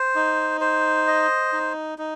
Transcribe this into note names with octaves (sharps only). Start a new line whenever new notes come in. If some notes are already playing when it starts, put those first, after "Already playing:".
Already playing: C5
D#4
C5
D#5
D#4
D#4